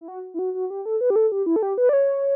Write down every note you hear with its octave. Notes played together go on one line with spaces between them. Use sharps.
E4
F#4
E4
F#4
F#4
G4
A4
B4
G4
A4
G4
E4
A4
G4
B4
D5
C#5